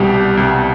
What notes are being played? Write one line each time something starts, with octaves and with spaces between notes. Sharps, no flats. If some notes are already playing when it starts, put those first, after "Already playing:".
Already playing: C2 B2 G3 G4
C2 B2 G3